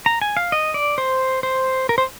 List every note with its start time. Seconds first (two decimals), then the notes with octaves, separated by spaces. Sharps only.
0.06 A#5
0.22 G#5
0.37 F5
0.52 D#5
0.74 D5
0.98 C5
1.43 C5
1.89 A#4
1.98 C5